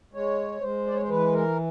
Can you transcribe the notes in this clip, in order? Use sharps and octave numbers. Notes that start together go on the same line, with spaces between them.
G#3 C#5
G#3 C5
D5
C#5
C5
E3 B4
A#4